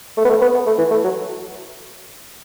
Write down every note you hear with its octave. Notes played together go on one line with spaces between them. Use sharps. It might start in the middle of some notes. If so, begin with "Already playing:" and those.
A3
B3
A3
B3
B3
A3
E3
A3
F#3